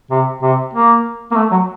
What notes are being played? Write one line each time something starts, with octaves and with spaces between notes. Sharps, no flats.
C3
C3
A#3
A#3
A3
F#3